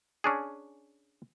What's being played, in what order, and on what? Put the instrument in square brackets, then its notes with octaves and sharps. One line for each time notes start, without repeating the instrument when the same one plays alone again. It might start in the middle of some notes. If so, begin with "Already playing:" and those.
[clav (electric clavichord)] C#4 D4 G#4